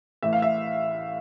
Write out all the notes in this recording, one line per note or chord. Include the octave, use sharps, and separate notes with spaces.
A1 A2 E3 E5
F5
E5